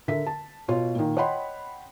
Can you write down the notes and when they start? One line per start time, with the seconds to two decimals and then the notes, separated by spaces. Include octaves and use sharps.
0.08 D3 A#4 E5 B6
0.27 A5
0.68 B2 F4 C#5
0.95 A#2 D#3
1.17 C#5 D#5 F#5 G5 B5 C6